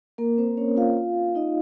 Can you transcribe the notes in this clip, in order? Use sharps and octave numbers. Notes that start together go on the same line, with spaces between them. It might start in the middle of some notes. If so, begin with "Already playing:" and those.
A#3 A#4
C4 C5
C#4 C#5
F4 F5
D#4 D#5